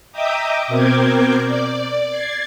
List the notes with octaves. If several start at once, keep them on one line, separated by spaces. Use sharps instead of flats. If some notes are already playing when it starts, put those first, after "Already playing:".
D#5 E5 G5 A#5 D6 D#6
B2 C4 A#4 D6 G6 G#6
D5
G#6 A6 C7